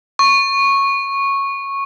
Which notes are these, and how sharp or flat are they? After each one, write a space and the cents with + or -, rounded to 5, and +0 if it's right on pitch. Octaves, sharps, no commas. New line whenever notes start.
C#6 -10